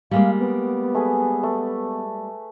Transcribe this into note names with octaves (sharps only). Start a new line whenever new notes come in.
G3 G#3 A#3 F5
B3
A3 G#4 B4
A3